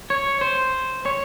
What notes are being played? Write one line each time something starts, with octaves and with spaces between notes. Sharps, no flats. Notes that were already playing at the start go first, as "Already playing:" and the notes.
C#5
C5
C#5